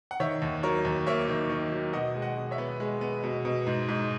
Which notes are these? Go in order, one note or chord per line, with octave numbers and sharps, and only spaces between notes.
F#5
D#3 C#5 E5
D#2
F#3 A#4 C#5
D#2
A#3 C#5 E5
D#3
D#3
F#3
B2 D#5 F#5
G#3
D#5 F#5
B2
C#5 E5
B3
G#3
B3
B2
B2
G#2
G#2